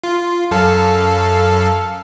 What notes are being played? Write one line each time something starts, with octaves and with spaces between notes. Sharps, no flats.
F4
F#2 A4 F5